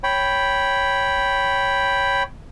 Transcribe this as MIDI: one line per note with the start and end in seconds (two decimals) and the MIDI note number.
0.04 2.23 73
0.04 2.23 79
0.04 2.23 83